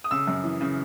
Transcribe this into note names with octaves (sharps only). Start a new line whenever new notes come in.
D#6
C#3 E6
F#2
E3
C#3